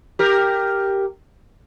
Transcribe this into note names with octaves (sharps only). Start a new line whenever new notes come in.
G4 A#4